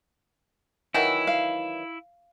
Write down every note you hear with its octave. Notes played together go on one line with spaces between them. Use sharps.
D#3 E3 F#3 E4
F5